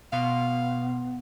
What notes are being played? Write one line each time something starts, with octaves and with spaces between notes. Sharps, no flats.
B2 B3 F5 C6